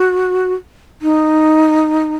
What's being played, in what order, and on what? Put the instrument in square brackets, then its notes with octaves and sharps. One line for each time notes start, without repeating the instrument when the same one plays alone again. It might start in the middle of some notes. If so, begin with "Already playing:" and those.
Already playing: [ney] F#4
D#4